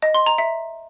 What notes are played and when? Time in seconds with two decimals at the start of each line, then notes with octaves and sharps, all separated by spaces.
0.02 D#5
0.14 C6
0.26 A#5
0.38 E5